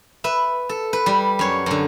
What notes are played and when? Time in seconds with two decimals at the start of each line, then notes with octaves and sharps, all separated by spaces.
0.24 B4 E5
0.69 A4
0.93 B4
1.06 G3
1.39 F#2 C#5
1.66 F#2 D3